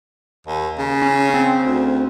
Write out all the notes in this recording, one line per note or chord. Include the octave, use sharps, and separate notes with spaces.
D#2
C#3
C#4
C4
D2